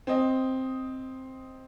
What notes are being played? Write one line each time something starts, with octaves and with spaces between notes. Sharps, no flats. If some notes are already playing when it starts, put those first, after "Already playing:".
C4 D#5